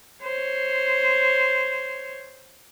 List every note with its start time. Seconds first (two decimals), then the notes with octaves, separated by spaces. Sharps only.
0.23 C5 C#5